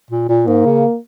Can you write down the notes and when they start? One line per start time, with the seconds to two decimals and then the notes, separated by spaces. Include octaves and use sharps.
0.10 A#2
0.29 A#2
0.46 G#2 A#3
0.65 C#3